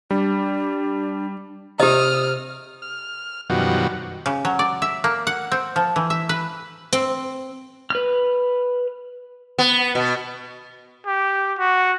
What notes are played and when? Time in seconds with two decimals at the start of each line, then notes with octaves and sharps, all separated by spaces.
0.11 G3 D4
1.80 C3 G4 D#5 D#6 F6
2.82 F6
3.50 F#2 B2 D#3 F3 G3 F#4
4.26 C#3
4.45 F#3
4.59 D5
4.82 E5
5.04 A#3
5.27 F#5
5.52 C4
5.76 F3
5.96 E3
6.10 E5
6.29 B4
6.93 C4
7.90 B4 F6
9.58 B3
9.95 B2
11.06 G4
11.58 F#4